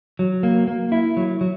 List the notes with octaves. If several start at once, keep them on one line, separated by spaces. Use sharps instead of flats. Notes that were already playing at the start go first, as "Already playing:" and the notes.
F#3
A#3
A#3
E4
F#3
F#3